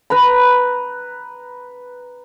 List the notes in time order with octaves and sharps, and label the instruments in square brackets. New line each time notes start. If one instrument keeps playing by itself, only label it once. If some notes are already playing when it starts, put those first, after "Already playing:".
[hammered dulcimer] B4 A#5 B5